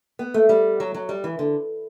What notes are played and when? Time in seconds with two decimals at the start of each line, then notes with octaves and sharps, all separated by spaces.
0.19 B3
0.34 A3
0.49 G3
0.80 F#3
0.94 F#3
1.09 G3
1.24 E3
1.39 D3